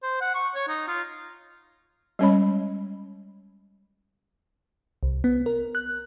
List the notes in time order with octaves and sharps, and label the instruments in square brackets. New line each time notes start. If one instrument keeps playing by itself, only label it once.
[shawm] C5
F#5
C#6
C#5
D#4
F4
[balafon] G3 G#3 C#4 C#5 D#5 B5
[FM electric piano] C2
B3
A#4
F#6